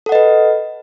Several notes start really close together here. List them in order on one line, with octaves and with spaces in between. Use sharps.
A4 F#5 D#5 B4